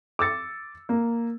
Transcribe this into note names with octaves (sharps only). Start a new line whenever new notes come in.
D6 E6 A6 C#7
A#3